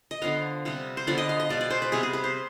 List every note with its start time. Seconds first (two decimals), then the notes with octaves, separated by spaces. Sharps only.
0.11 D#5
0.22 D3 F3 B3 F5
0.65 C3 G3 B3
0.97 C5
1.07 D3 F3 B3 D5
1.18 D#5
1.29 F5
1.40 D#5
1.49 B2 G#3 B3 D5
1.61 D5
1.70 C5
1.82 B4
1.92 C3 G3 B3 G#4
2.03 G#4
2.13 B4
2.24 C5